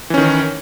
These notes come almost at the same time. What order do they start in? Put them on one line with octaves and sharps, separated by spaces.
E3 C#4 D#3